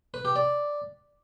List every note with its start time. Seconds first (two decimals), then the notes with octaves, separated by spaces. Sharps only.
0.14 B4
0.25 G4
0.36 D5